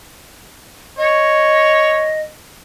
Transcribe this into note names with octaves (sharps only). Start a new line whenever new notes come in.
C#5 D#5